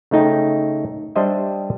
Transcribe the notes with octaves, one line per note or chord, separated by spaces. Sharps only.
C#3 A3 D#4 G5
G3 D4 C5 D#5 E5